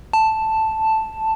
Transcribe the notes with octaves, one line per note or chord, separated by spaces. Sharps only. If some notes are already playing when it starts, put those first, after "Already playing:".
A5